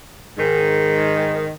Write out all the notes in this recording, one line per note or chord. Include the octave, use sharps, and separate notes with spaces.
G#2 D#3